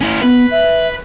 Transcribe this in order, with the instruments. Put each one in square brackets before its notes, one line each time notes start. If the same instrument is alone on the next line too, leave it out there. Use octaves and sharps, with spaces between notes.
[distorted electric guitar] C#4 E4
[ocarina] B3 [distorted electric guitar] B4
[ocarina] E5